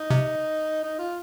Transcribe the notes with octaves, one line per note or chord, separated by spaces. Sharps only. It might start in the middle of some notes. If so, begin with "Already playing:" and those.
Already playing: D#4
C3
D#4
F4